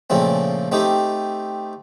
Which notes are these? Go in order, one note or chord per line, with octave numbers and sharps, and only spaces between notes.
A#2 C#3 F3 A3 C4
A3 C4 D#4 G4